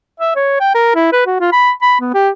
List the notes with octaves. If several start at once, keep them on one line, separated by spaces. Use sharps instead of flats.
E5
C#5
G5
A#4
E4
B4
F#4
F4
B5
B5
B3
G4